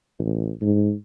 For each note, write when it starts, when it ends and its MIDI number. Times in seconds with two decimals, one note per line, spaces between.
0.19 0.51 33
0.61 0.93 44